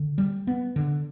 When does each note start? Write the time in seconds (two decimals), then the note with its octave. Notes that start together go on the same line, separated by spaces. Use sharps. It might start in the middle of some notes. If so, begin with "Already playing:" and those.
Already playing: D3
0.18 G3
0.47 B3
0.76 D3